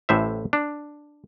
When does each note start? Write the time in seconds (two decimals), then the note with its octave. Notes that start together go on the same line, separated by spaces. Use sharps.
0.09 A1 A2 C5 E5
0.53 D4